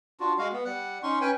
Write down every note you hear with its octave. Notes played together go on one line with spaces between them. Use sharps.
D4 F4 F#4
G#3 F#4 F5
B3
G3 F#5
C#4 D#4 C6 C#6
C#4 B4 G5 G#5